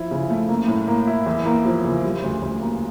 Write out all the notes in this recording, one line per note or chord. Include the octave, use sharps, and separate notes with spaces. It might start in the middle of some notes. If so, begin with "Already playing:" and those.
Already playing: F3 E4
C#3
A3
A#3
A2
A#3
E4
E2
A#3
F3
C#3
G3
D2
D2
A#3